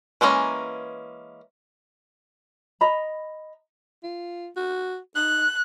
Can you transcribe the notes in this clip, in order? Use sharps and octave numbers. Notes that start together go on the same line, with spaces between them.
E3 G#3 A#3 C#4 A#5
D#5 A#5 B5
F4
F#4
D#4 F#6